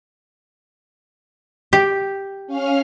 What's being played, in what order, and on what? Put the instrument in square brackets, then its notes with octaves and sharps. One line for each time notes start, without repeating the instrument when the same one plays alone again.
[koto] G4
[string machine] C#4 F5 F6